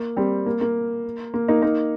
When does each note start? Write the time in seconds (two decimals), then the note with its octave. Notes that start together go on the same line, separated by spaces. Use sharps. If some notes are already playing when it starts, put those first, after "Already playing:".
Already playing: A#3
0.17 G3 C4
0.46 A#3
0.61 A#3
1.34 A#3
1.48 A#3 D#4
1.62 A#3 D#4